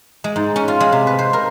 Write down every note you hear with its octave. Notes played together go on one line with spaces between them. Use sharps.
G#3
G#2
C#4
F4
G#3
C3
B4
C5
A#4